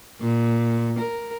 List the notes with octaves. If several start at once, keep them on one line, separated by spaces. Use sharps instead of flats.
A#2
A#4